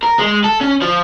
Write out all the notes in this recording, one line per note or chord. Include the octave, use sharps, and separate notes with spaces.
A#4
G#3
A4
C#4
F3